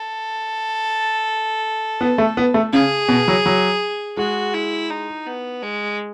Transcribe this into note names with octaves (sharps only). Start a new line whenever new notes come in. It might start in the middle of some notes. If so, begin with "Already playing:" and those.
Already playing: A4
B3
A3
B3
A3
C#3 G#4
B2
F#3
F#3
G#3 F#4
E4
D#4
B3
G#3